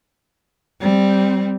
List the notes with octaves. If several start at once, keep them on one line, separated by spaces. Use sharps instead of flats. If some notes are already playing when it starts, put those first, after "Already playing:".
G3 C4